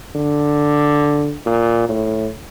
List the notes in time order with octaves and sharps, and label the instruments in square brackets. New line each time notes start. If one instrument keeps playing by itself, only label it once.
[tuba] D3
A#2
A2